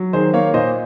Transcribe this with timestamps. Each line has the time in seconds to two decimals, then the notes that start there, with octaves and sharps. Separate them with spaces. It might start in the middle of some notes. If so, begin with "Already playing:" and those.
Already playing: F#3
0.13 D#3 G#4 C5
0.33 A#3 C#5 F5
0.54 A#2 C5 D#5